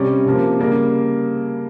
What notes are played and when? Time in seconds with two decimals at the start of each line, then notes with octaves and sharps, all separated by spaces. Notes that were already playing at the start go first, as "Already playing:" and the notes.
Already playing: C3 G3 C#4
0.26 C3 F3 A#3
0.59 C#3 G3 A#3